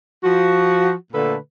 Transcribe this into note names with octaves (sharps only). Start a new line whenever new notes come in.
F3 F#4
A#2 D3 A3 A4 B4